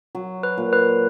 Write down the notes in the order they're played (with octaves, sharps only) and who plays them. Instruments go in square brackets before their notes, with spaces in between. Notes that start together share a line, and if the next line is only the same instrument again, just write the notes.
[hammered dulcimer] F#3
[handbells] B4
[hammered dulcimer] A#2
[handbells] B4